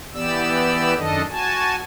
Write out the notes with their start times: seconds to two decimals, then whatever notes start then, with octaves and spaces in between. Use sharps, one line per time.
0.14 E3 B3 G4 D5 E6
0.96 F#2 D#3 D4 A4 D#5
1.30 F#4 G#5 A5